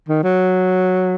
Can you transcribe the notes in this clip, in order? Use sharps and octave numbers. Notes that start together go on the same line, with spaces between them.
D#3
F#3